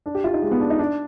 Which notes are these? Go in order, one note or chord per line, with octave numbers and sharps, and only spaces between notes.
D4
G4
F4
D#4
G#3
B3
D4
D#4
D4